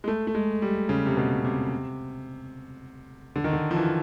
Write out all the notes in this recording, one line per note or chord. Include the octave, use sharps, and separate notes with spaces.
G#3
A3
A3
G#3
G3
C#3
C3
B2
C3
D3
D#3
D3
F3
E3